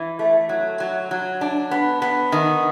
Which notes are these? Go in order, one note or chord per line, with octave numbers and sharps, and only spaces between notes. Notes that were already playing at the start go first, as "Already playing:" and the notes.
Already playing: E3
A3
F#3
F#3
F#3
D4
B3
B3
D#3